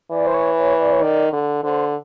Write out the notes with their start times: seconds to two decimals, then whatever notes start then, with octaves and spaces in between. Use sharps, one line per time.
0.10 E3 D5
0.27 C5
0.34 C#5
0.57 C#5
0.80 D5
0.92 C#5
1.02 D#3 D5
1.33 D3
1.63 D3 C5